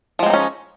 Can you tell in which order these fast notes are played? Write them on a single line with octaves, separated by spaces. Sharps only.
F3 G#3 C4 D#4 C#4